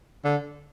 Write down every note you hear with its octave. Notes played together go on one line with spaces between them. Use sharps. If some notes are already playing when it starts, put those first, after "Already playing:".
D3